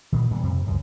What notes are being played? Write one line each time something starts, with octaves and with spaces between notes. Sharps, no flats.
G2 A#2 D#3
A#2 G3 B3
F2 C3
C#2 F#2